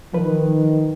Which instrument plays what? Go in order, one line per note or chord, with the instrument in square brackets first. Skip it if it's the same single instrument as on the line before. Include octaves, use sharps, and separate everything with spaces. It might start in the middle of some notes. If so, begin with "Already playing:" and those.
[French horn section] D#3 [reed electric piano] F3 B4